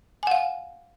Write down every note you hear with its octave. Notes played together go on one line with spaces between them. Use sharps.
F5 F#5 G#5